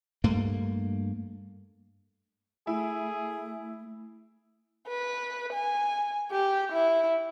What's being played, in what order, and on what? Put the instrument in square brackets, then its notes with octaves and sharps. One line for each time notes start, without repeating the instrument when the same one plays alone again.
[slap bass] G2 A3 A#3
[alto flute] A3 [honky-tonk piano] E4 [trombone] G#4
[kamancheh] B4
G#5
G4
E4